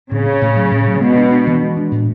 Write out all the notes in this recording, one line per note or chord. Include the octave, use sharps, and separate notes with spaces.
A2 C#3
C#4
A2
F#3
A2
F#3
B2 G#3
D4
D4
E3
G#3
D4
A2